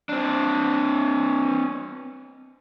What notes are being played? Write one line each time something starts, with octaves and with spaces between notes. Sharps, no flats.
C4 D4